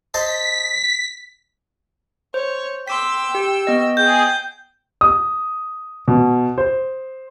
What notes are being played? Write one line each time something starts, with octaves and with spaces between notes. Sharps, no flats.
C5 D#5 A5 B6
C5 C#5
G5 C6 D6 E6 B6
G4
B3 D#5
G#4 G5 G6
D#6
B2
C5